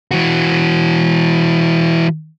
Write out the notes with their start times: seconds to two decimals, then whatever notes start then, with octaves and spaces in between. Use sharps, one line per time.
0.11 E3 F#4